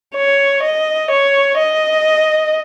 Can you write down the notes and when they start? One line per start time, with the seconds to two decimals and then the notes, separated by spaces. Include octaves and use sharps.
0.16 C#5
0.63 D#5
1.11 C#5
1.58 D#5